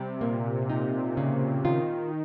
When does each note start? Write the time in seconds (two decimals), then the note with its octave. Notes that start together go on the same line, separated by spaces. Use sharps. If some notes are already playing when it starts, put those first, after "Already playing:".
Already playing: C3 G3
0.21 A#2 A#3
0.69 C3 D#4
1.17 C#3
1.65 D#3 F4